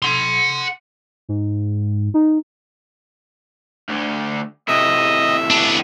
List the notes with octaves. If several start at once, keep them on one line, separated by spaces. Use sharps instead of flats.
F#5 C6
G#2
D#4
D2 D3
A2 C3 D#5 E5
B3 D4